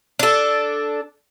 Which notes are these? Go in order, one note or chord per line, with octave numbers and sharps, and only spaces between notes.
D4 A4